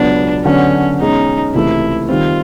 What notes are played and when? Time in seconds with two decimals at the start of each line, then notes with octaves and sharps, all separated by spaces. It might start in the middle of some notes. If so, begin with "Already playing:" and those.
Already playing: C#2 B2 F#3 B3 D4
0.45 D3 F#3 B3 C#4 D4 F#4
1.00 B2 G#3 C#4 D#4
1.54 C#2 C3 E3 A3 E4
2.09 D#3 G3 C4 F4